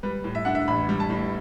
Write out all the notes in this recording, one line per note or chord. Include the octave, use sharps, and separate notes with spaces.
G3 B4
A2
E5
D4 F#5
E5
A1 B5
G3
A5
A2